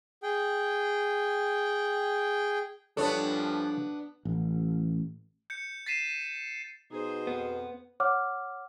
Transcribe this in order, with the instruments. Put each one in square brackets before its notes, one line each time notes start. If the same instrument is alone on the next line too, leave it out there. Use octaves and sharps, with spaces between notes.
[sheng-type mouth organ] G#4 G5
[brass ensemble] G2 A#2 F3 [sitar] B3 D4 [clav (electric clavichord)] A4 C#5
[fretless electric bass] A1
[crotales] G6 C#7
A6 B6 C7 D#7 E7
[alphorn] B2 [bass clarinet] D#4 [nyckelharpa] G#4 C5
[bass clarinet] F2 [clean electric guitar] B3
[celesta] C#5 F#5 D6 F6